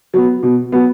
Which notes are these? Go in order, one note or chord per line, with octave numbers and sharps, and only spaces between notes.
F#3 B3
B2
F#3 B3